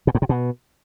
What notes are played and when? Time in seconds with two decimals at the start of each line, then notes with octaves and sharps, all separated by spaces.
0.07 B2
0.15 G#2
0.22 C3
0.29 B2